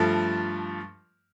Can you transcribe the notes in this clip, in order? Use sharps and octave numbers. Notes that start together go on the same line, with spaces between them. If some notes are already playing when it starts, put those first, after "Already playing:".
Already playing: G2 F3 A3